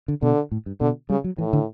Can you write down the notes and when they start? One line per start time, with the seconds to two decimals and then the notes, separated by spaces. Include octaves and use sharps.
0.08 D3
0.22 B2 D3
0.52 A2
0.66 G2
0.80 B2 D3
1.09 C#3 G3
1.24 F#3
1.38 A2 E3
1.53 D3